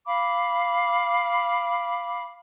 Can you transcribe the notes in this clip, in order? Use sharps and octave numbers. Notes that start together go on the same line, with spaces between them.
F5 B5 D6